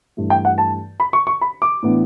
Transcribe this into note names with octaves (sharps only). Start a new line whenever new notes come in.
G2 E3 A3
G5
F#5
A5
B5
C#6
C#6
B5
D6
A2 E3 B3 D4